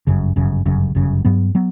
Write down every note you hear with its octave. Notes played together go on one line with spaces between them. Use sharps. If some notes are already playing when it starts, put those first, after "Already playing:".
G1 F#2 C#3
G1 F#2 C#3
G1 F#2 C#3
G1 F#2 C#3
G2 F#3 B3
F#3 B3